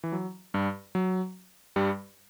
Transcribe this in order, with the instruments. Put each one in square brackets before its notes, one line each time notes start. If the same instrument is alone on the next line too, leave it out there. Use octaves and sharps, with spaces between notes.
[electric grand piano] E3
F#3
G2 G3
F#3
G2 G3